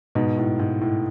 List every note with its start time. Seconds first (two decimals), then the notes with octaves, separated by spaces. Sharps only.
0.15 G#2 B2
0.38 A2
0.59 G#2
0.81 A2